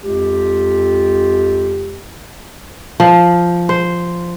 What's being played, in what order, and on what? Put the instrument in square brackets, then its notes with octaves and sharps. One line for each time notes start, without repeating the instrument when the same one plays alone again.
[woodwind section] F2 G#3 F4 G4
[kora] F3
C5